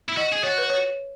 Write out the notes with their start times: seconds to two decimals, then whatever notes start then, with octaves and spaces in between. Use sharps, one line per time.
0.08 E4
0.17 F#4 D#5
0.32 G#4
0.43 F#4 C#5
0.58 B4
0.70 C#5